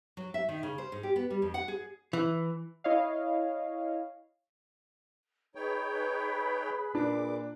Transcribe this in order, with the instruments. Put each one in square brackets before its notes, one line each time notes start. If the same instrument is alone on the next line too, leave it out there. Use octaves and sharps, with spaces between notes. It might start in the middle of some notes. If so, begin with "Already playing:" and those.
[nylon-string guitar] F#3
E5
D#3
C#3
C5
G#2
G4
B3
G3
F2
F#5
G#4
[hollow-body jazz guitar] E3
[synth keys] E4 C#5 D#5 F5
[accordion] D#4 C#5 G5 [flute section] G#4 B4 B5
[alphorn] A#2 [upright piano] D4 [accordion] D6